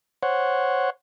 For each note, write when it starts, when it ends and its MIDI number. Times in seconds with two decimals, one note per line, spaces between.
0.23 0.90 72
0.23 0.90 73
0.23 0.90 78